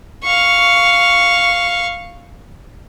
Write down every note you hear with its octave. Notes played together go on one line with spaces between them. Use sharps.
F5 C#6